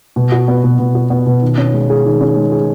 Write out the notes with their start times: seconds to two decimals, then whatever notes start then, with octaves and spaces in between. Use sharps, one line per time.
0.16 B2
0.32 F#4
0.48 B3
0.64 B2
0.79 B2
0.95 F#4
1.10 B3
1.26 B2
1.42 D#3
1.58 C#4
1.73 G#3
1.90 G#4
2.06 D#3
2.21 C#4
2.36 G#3
2.52 G#4